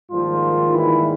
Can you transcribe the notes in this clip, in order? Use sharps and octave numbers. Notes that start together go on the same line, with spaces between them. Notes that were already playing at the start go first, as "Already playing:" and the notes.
G#2 D#3 F3 G3 A#3 F4
E3 E4